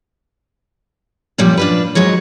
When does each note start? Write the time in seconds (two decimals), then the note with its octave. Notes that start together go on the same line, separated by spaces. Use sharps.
1.38 F#2 A#2 F3 G3
1.58 D4 F4 B4
1.95 G#2 F#3 G#3 C#5